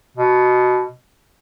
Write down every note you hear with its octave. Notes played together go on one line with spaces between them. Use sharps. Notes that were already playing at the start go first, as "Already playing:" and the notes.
B2